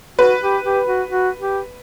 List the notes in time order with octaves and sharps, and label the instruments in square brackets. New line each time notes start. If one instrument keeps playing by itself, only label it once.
[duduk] F#4 [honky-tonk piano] B4
[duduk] G4
G4
F#4
F#4
G4